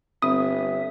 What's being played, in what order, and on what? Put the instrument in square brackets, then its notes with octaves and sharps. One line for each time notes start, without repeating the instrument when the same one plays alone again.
[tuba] G1 [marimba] C4 [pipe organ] E5 [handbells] D#6